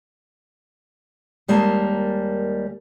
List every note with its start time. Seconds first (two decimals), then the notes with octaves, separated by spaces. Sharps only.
1.48 D#2 G3 G#3 A#3 A#4 A5